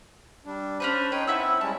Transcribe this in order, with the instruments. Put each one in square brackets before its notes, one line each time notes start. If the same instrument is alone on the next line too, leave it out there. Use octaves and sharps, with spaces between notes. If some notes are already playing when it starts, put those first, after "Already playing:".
[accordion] G3 D4
[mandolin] C#4 D4 B4 [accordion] C5
[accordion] D#4 C#5 G5 [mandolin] B4
[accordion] C4 E4 [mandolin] E5 F#5 E6
[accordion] G3 G#3 C#4 [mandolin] A5